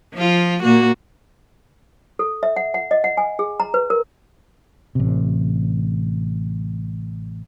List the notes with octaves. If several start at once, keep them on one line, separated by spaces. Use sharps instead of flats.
F3 F4
A#2 A#3 F#4
A4
E5
F#5
F#5
D#5
F#5
G#5
G#4
A#5
B4
A#4
A1 C3